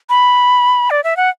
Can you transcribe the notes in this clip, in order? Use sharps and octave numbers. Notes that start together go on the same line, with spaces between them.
B5
D5
E5
F#5